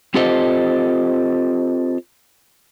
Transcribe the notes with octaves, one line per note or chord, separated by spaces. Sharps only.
C4 F4 G4 A4 C5 D#5